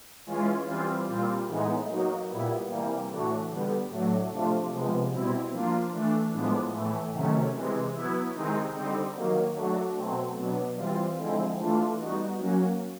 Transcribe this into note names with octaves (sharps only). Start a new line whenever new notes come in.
E3 G#3 C#4 F4
E3 G3 C4 F4
A#2 G3 C4 F4
A2 E3 G#3 B3 D#4
F#3 A#3 D#4 F#4
A#2 G3 B3 E4
C3 E3 G3 A#3
A2 E3 A3 D4 F#4
D3 G3 B3
A2 F#3 A3 D4 F#4
C3 F3 A3 D4 F4
C3 F3 G#3 B3
B2 G3 C4 E4
F3 A#3 D4 F4
E3 A3 D4
A2 F3 G#3 B3 D4
A2 E3 A3
C3 D#3 F#3 A3 C#4
C3 E3 G#3
F#3 B3 E4
C3 D#3 G#3 C4 D#4
D3 G3 C4 D#4
D#3 F#3 A#3
F#3 A3 D4 F#4
B2 F#3 A3 C4
B2 F#3 B3 D4
E3 G3 C4 F4
D3 F3 G#3 C4 E4
E3 A3 D4 F4
G3 B3 D#4 F#4
F#3 A#3 C#4 F#4